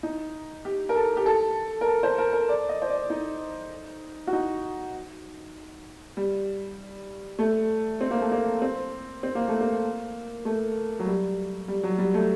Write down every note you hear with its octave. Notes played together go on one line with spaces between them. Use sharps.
D#4
G4
A#4
A4
G4
A4
A#4
A4
C5
A#4
A#4
D5
D#5
C5
D5
D#4
F#4
D#4
G3
A3
C4
A#3
A3
A#3
C4
C4
A#3
A3
A#3
A3
F#3
G3
G3
F#3
G3
A3